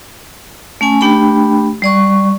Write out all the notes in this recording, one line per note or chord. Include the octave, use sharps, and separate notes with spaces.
A3 C#4 G#5
A3 D4 G4 G5 B5
G3 D5 C#6